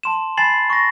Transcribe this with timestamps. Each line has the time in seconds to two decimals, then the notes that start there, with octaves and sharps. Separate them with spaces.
0.03 A5 C6 E7
0.37 G#5 B5 A6 C7 E7 F#7
0.70 C#6 A#6